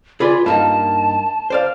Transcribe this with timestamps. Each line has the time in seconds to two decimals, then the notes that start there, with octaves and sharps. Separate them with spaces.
0.20 F4 G#4 B4 D5
0.46 G2 A#3 D#4 A5
1.50 C5 D5 F5